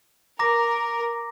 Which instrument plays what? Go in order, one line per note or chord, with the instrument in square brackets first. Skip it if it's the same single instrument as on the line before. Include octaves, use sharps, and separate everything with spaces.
[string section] A#4 [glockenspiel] A#5 D6 A#6